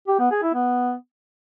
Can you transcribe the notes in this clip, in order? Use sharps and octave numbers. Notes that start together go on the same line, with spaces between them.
G4
B3
G#4
E4
B3